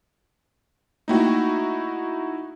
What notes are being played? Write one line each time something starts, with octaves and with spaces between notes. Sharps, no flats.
A3 A#3 D#4 E4 F#4 G5